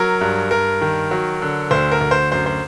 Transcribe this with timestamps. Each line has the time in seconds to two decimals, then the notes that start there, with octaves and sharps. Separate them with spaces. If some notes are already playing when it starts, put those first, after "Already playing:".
Already playing: F#3 A#4
0.21 G2
0.51 G2 A#4
0.81 D#3
1.11 F#3
1.42 D3
1.71 D2 C5
1.92 A#4
2.01 D2
2.11 C5
2.32 F#2 C5
2.46 C5